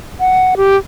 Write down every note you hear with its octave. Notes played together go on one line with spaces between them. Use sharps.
F#5
G4